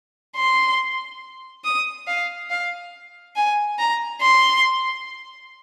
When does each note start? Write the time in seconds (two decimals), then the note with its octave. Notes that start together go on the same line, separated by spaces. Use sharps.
0.36 C6
1.65 D#6
2.07 F5
2.50 F5
3.36 G#5
3.79 A#5
4.22 C6